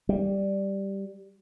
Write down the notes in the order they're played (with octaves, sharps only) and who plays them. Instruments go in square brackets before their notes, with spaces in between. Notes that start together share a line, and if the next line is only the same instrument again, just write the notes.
[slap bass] G3